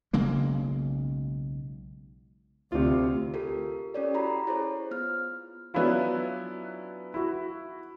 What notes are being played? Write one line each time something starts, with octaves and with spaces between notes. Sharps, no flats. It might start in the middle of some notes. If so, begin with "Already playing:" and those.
B1 C#3 G#3 A#3
D2 C3 F4
F4 G4 A4 A#4
C#4 G4 A4 C#5 D5
E4 F#4 A#5 B5
E4 G#4 C5 C#5
B3 F4 F6
F#3 B3 C#4 D4 E4 F4
E4 F#4